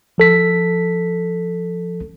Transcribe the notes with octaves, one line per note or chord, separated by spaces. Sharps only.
F3 A4 B6